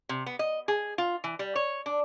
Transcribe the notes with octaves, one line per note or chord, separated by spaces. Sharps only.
C3
B3
D#5
G#4
F4
E3
G3
C#5
D4